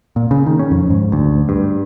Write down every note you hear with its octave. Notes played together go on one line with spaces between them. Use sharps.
A#2
C#3
D#3
C#4
F2
G#2
D2
G2